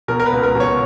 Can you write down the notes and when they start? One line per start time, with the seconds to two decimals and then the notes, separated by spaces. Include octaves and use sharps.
0.08 B2 A#4
0.20 A#4
0.26 B4
0.32 C#2
0.43 A#4
0.55 B2
0.60 C#5